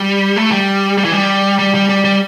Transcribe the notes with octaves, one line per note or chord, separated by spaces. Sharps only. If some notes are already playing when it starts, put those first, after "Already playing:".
Already playing: G3
A3
G3
G3
E3
G3
G3
G3
G3
G3